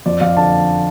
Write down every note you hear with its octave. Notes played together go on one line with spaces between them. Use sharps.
F2 D5
F2 F5
D3 A5